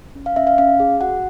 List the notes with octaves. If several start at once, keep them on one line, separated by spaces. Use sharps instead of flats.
C#4
F5
C#4 E5
F5
C#4 F5
G#4
F#4 F#5